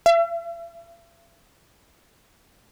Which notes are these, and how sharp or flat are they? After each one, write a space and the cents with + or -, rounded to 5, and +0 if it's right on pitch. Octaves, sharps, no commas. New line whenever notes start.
E5 +45